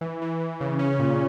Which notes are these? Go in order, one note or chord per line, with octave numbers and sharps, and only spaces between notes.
E3
E3
E3
C#3
C#4
A#2